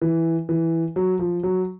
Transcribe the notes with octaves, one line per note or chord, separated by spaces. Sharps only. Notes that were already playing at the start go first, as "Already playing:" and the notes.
E3
E3
F#3
F3
F#3